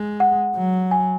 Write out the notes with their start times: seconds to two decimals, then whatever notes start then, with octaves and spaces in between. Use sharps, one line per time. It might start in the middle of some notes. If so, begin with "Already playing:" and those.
Already playing: G#3
0.20 F#5
0.56 F#3
0.91 G#5